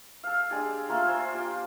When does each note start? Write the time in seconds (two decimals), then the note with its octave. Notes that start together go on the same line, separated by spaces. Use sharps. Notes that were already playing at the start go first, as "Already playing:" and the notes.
0.24 A4 F5
0.50 G#3 D4 G4 G#5
0.89 A3 A#3 F4
1.07 F4 C5 G#5
1.34 G4 G5